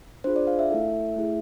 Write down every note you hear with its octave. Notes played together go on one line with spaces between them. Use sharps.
D4 F4 G#4 C5
D5
F5
E5
A3 E4 A4
A3 E4 G#4